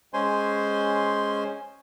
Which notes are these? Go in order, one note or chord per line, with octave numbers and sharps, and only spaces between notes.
G#3 C#4 C5 G#5 C6